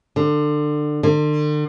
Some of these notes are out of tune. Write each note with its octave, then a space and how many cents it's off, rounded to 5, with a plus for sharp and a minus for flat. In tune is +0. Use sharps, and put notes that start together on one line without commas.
D3 +25
D3 +40